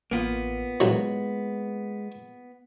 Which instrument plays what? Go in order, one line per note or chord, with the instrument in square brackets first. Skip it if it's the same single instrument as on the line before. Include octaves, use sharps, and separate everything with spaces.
[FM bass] A1 [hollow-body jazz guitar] A#3 B3 F4
[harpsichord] A1 F#3 [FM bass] G#3